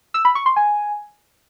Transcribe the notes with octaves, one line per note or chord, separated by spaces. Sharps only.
E6
B5
C#6
C6
G#5